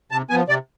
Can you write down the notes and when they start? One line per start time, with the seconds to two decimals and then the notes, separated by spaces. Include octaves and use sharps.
0.11 C3 A5
0.30 F3 B3 G#5
0.48 C3 D5